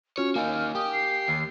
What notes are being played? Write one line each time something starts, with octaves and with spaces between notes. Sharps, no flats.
C#4 F4 F#4 C#5 F6
A#3 D#4 A#4 F5 G#5
G4 D#6
C7
D#2